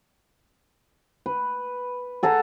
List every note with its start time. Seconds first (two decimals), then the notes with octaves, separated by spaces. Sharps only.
1.26 B4
2.23 G#4 A4 F#5 A#5